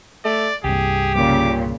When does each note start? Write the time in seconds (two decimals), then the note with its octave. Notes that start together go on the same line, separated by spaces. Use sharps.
0.25 A3 D5
0.64 C2 G2 G4 G#4
1.15 A#2 C#3 D6